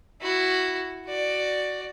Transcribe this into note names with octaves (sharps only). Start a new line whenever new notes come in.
E4 F#4
F#4 D5